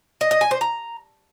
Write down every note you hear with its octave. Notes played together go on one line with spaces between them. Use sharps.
D#5
D#5
G#5
C5
A#5